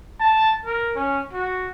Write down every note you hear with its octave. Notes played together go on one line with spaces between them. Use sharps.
A5
A#4
C#4
F#4